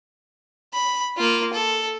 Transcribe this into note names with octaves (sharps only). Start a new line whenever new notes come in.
B5
A#3 F4
A4